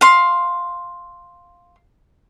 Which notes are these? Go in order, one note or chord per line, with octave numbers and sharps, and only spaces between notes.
F5 C6